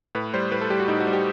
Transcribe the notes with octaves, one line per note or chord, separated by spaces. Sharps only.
A2 B4
G3 C5
A2 B4
A4
G3 G4
F#4
A2 D#4
F#4
G3
G4